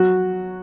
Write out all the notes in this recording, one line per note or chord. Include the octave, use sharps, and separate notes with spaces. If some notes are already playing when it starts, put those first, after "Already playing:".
Already playing: F#3 F#4